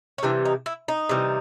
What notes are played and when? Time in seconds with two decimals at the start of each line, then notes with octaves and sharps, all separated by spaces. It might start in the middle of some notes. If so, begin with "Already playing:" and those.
0.18 C#4
0.23 C3 E3 G3 D4
0.45 D#4
0.66 E4
0.88 D#4
1.09 C3 E3 G3